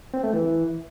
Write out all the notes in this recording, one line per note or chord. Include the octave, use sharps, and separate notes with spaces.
C4
A3
E3